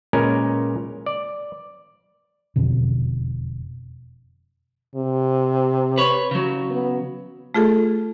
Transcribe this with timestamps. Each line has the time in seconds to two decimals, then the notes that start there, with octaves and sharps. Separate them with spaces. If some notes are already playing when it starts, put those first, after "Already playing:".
0.13 A#2 G#3 C#4 A#4 B4
1.06 D5
2.56 E1 F2 B2 D3
4.96 C3
5.98 B4 C#5
6.31 C#3 F#3
6.70 B3
7.54 A3 F4 G#4 A4